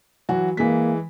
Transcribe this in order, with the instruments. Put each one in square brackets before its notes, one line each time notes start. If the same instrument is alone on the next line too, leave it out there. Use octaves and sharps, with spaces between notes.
[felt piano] E3 F#3 F#4
[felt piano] E3 G#3 B6 [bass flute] A#3